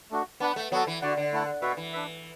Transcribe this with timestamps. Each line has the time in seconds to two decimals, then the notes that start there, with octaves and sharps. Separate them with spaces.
0.11 A3 D4 F#4
0.40 B3 D4 B4 F#5
0.56 A3
0.72 F#3 B3 F#4 A4
0.87 E3
1.01 D3 F#4 D5 F#5
1.17 D3
1.32 A3 E4 A4 F#5
1.62 B2 F#4 B4 E5
1.77 E3
1.93 D4 B4 E5